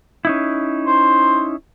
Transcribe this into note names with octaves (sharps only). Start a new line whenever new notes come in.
C#4 D#4 E4
C5